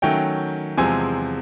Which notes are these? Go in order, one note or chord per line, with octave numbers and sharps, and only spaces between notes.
D#3 F#3 A3 C#4 G5
E2 C3 F3 G#3 C4 G#5